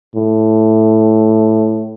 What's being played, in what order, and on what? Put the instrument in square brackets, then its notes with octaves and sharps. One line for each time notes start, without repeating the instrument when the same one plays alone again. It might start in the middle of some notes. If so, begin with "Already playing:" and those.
[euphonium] A2